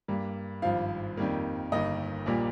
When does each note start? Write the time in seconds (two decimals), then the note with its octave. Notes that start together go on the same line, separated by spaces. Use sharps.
0.08 G2 G3 A#3
0.62 G#1 G2 F3 F5
1.17 F2 D#3 G3 A#3
1.72 G1 G2 D#3 A#3 D#5
2.26 A#1 A#2 G3 A#3